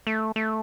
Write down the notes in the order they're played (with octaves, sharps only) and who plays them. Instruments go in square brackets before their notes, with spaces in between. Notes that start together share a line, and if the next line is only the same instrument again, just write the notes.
[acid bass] A3
A3